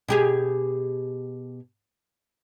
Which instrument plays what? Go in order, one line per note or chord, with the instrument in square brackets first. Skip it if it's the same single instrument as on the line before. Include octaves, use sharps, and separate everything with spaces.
[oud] B2 G4 G#4